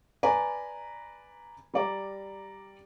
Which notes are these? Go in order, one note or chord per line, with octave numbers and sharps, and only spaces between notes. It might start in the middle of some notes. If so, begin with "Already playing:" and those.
B4 D5 G#5 A#5 B5
G3 D5 A#5